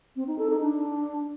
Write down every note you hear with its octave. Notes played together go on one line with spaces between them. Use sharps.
C4
D#4
A4
D#4
D4